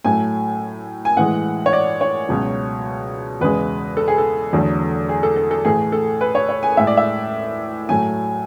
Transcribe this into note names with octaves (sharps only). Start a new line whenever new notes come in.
A2 F#3 A3 G#5
G#5
A2 E3 G#3 F#5
C#5
D5
C#5
C#2 B2 F#3
E2 C#3 G#3 B4
A4
G#4
A4
E2 D3 F#3 A3
G#4
A4
A4
A4
A2 E3 A3 G#4
A4
B4
C#5
C#5
G#5
A2 G#3 E5
D5
E5
A2 F#3 A3 G#5